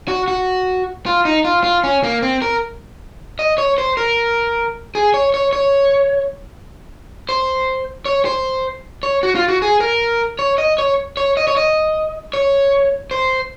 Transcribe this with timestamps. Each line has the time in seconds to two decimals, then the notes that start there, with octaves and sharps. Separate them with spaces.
0.08 F#4
0.28 F#4
1.06 F4
1.25 D#4
1.45 F4
1.64 F4
1.84 C#4
2.03 A#3
2.22 C4
2.42 A#4
3.39 D#5
3.58 C#5
3.78 C5
3.97 A#4
4.95 G#4
5.14 C#5
5.34 C#5
5.53 C#5
7.29 C5
8.06 C#5
8.25 C5
9.03 C#5
9.23 F#4
9.35 F4
9.48 F#4
9.62 G#4
9.80 A#4
10.39 C#5
10.58 D#5
10.78 C#5
11.17 C#5
11.37 D#5
11.47 C#5
11.57 D#5
12.33 C#5
13.11 C5